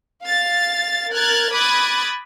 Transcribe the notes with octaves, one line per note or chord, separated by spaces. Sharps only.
F5 A6
A#4 F6 F#6 G#6 A6
B5 D6 D#6 F#6 G#6 A6